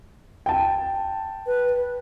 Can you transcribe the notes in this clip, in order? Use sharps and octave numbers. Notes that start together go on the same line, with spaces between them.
G5 A5
B4